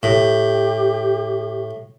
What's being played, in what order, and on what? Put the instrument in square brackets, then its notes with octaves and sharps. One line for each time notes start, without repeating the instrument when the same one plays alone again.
[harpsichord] A2 [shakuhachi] G4